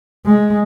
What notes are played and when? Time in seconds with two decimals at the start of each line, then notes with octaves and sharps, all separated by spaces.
0.26 G#3